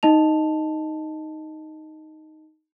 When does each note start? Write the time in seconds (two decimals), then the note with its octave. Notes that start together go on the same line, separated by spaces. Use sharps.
0.03 D#4 D#5 A5 F7